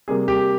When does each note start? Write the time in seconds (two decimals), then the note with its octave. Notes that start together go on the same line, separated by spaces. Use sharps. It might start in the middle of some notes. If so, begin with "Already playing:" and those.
0.08 C3 G3 A#3 G#4
0.28 G4